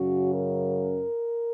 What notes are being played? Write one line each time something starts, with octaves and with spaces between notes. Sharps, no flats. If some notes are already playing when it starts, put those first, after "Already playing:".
Already playing: F#2 C#3 F#3 C#4 F#4
A#4